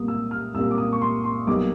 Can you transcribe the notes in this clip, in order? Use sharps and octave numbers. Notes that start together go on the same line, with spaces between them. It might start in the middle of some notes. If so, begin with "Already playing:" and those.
Already playing: C2 A#2 G3 A#3 D#6
E6
F6
C2 A#2 G3 A#3 E6
D6
D#6
C#6
C6
C6
B1 B2 G3 A#3 D6